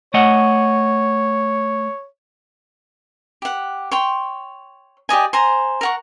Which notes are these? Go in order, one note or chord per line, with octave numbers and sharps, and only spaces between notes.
A3 C#5 D#5 F#5
G4 F#5
C#5 G5 C6
G4 D5 D#5 G#5
C5 G#5 A#5
A#4 F#5 C#6